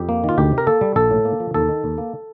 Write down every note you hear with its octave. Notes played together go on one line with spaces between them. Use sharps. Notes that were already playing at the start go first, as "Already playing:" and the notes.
Already playing: F2 G4
A#3
D#3
F4
D2 G4
C3
A#4
A#3 A4
G3
A#1 A4
A2
A#3
F3
D#2 A4
D#3
D#2
A#3